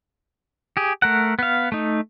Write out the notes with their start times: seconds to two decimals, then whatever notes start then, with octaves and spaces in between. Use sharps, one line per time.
0.77 G4 G#4
1.02 A3 A#4 F#5
1.39 B3 F5
1.72 A3 D#4